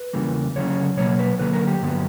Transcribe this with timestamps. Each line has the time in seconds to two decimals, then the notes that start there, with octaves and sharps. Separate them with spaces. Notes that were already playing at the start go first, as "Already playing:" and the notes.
Already playing: B4
0.13 E2 C#3 E3 G3 A#3
0.56 D2 C#3 F#3 C#4 C#5
0.97 B2 F#3 A#3 C#5
1.19 B4
1.39 D2 D3 F#3 A#3 B4
1.53 A#4
1.67 G4
1.82 G2 D3 F#3 B3